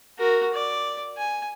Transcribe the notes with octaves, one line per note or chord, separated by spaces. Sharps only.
F#4 A#4
D5
G#5